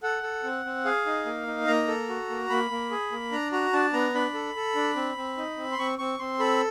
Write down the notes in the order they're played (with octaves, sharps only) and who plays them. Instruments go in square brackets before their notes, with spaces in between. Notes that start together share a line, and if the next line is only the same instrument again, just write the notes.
[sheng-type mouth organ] A4 F#5
A4
C4
C4
G#4 F5
D#4
A#3
D#4
A#3 A#5
A4
F#4
A#3
A#3 B5
A#3
G#4
A#3
D4 A#5
F#4 A#5
D4 A5
B3 A#5
D4 B5
A4
A4
D4
C4
C4
D#4
C4
C6
C4 C#6
C4 C#6
C4 C6
A4 B5